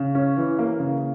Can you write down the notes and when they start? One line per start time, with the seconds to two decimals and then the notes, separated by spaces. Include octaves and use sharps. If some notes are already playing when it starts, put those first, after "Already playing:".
Already playing: C#3
0.15 C#4
0.37 E3
0.59 A#3
0.80 C#3